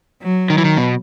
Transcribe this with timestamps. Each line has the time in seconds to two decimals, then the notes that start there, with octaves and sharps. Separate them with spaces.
0.23 F#3
0.50 D#3
0.58 E3
0.65 D#3
0.77 B2